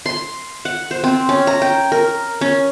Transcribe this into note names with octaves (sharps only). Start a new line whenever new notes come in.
C6
F#5
C5
C4
C#4
A#5
G5
A#4
C#4